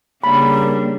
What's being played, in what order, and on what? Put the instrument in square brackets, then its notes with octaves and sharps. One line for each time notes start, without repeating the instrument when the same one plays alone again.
[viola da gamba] C#3 G3 D4 [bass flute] A#3 [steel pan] B5